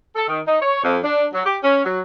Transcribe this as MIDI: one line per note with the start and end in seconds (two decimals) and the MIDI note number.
0.16 0.23 69
0.28 0.39 51
0.46 0.59 63
0.61 0.81 73
0.83 0.96 41
1.04 1.25 62
1.33 1.43 54
1.45 1.57 67
1.63 1.84 61
1.85 1.99 54